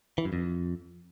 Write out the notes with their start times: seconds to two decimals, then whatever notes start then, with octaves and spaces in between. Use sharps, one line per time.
0.18 E3
0.25 F#2
0.33 F2